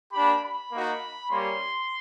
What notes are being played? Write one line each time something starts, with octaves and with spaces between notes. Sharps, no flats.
A#3 D4 G4 B5
B5
A#3 D#4 F#4
G3 A#3 C#4 C6